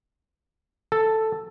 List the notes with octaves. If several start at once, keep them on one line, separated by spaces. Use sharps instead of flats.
A4